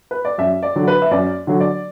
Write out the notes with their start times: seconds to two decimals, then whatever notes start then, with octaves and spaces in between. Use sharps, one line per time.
0.11 B4
0.25 D5
0.38 F#2 E5
0.63 D5
0.76 D3 F#3
0.88 B4
1.02 E5
1.11 F#2 D5
1.47 D3 F#3
1.60 D5